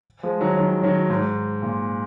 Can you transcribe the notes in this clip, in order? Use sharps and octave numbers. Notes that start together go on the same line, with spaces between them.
F3 G#3
D#3 F#3
D#3 F#3
D#3 F#3
G#2
A#2